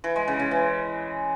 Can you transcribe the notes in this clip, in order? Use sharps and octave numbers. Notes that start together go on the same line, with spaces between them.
E3
G#3
C#3
C#3
E3